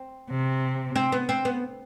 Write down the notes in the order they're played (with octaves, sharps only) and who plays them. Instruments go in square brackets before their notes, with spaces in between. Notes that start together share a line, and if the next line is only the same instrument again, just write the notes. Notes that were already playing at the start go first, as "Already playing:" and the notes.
Already playing: [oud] C4
[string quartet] C3
[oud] C4
B3
C4
B3